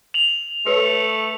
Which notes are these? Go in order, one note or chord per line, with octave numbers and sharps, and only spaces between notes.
F7 F#7
A3 B4 C#5 C#7